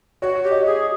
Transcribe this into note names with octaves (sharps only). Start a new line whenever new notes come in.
F#4 C#5
G4
D#5
G#4